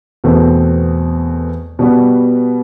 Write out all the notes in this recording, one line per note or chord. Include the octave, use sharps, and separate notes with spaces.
E2 B2 A3 C4
B2 G3 B3 F#4